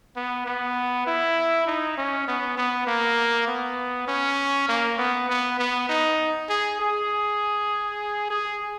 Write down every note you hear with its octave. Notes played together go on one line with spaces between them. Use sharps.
B3
B3
E4
D#4
C#4
B3
B3
A#3
B3
C#4
A#3
B3
B3
B3
D#4
G#4
G#4
G#4